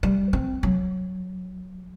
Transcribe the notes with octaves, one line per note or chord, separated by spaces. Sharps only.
G3
C4
F#3